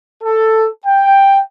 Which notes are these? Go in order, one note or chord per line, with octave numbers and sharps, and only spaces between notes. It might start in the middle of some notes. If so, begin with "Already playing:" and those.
A4
G5